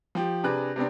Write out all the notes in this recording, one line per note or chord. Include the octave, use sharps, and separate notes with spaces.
F3 G4
C3 D4 G#4 B4 F#6
C3 B3 C4 D4